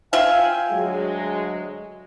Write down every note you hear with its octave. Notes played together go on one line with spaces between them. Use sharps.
F4 E5 F5 G5 G#5
D2 F#3 G#3